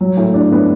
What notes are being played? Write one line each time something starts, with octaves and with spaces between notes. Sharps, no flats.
F#3
A2
D4
B3